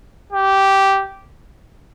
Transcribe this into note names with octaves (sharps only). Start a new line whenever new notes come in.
G4